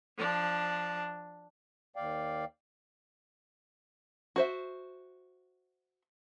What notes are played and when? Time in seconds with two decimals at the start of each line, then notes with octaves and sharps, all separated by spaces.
0.17 F3 D4
1.96 D#2 D5 F5 G5
4.36 F#4 C5 E5